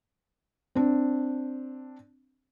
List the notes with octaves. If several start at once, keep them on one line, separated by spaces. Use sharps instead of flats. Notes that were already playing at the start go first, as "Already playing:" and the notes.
C4 D4